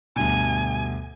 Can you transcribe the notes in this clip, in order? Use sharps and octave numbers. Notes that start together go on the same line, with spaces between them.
D2 G2 B2 G#5